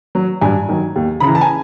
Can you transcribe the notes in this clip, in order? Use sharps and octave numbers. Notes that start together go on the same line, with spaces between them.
F#3
G2 G#5
D#3 F#3
D#2
C#3 B5
E3 A#5
A5
G#5